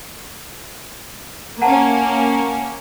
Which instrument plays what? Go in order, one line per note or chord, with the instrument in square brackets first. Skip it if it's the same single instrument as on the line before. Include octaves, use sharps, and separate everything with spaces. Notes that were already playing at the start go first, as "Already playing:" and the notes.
[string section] A#3 C#4 [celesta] F#5 A5 A#5